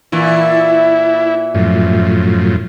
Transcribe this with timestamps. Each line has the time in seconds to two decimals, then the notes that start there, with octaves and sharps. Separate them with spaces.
0.12 A#2 E3 E4
1.55 F#2 A2 F3